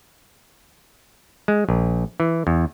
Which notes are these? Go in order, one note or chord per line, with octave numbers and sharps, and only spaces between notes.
G#3
A#1
E3
E2